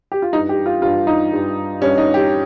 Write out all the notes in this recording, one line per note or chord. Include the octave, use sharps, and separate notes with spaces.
G4
F4
G2 G3 D#4
G4
F4
G2 G3 F4
D#4
G2 G3
G2 G3 C#4
D#4
G4